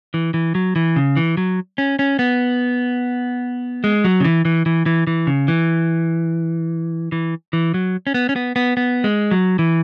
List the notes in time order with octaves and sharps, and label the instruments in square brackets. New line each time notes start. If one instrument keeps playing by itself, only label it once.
[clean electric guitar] E3
E3
F#3
E3
C#3
E3
F#3
C#4
C#4
B3
G#3
F#3
C#3
E3
E3
E3
E3
E3
C#3
E3
E3
E3
F#3
C#4
B3
C#4
B3
B3
B3
G#3
F#3
E3